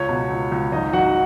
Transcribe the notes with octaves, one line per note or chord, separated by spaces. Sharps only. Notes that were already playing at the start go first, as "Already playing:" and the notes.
Already playing: C#2 C#5
B2
C#2
C#2
G#1 D#4 D#5
G#1 F#4 F#5